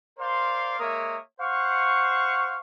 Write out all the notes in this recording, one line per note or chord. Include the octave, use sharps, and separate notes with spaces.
A#4 C5 D5 F5 C6
G#3 A#3 A#4 C#5 E5 D#6
C5 F5 F#5 C#6